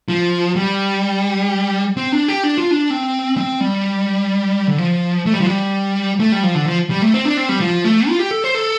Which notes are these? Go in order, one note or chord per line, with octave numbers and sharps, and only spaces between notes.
F3
G3
C4
D4
G4
D4
F4
D4
C4
C4
G3
D3
F3
A3
G3
F3
G3
A3
G3
F3
D3
F3
G3
A3
C4
D4
C4
G3
F3
A3
F4
G4
A4
C5
A4